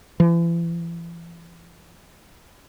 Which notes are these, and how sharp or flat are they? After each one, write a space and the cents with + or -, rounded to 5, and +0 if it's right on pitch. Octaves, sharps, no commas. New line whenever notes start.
E3 +40